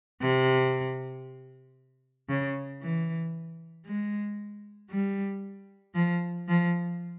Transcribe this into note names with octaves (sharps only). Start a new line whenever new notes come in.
C3
C#3
E3
G#3
G3
F3
F3